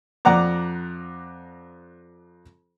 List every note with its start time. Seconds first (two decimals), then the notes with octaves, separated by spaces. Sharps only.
0.25 F2 D5 F#5 A#5 D6